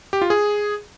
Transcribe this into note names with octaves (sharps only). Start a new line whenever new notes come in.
G4
F4
G#4